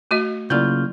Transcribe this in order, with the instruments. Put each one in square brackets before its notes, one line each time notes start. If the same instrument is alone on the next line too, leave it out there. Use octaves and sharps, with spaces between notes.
[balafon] A3 F#4 D#5
[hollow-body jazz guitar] C#3 F4 [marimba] F#3 E4 D5 [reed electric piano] A#3 F6 G6